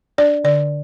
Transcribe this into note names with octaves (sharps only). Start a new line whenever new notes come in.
D4 D5
D3 D5